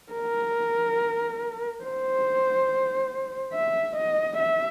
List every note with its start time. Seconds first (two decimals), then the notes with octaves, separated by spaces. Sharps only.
0.13 A#4
1.84 C5
3.54 E5
3.96 D#5
4.39 E5